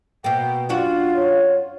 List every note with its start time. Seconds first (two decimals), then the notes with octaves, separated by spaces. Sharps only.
0.24 B2 A#3 G5
0.69 F#2 D4 F4 F#4
1.15 C#5